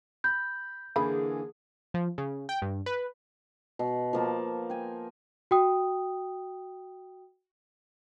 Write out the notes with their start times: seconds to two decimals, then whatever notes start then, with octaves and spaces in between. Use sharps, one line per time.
0.24 B5 G6
0.96 D3 E3 A#3 E4 G#4 B5
1.94 F3
2.18 C#3
2.49 G5
2.62 G2
2.86 B4
3.79 B2
4.13 F3 A#3 A5
4.70 G5 G#5
5.51 F#4 G5 D#6